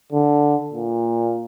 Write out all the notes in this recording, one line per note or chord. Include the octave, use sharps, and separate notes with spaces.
D3
A#2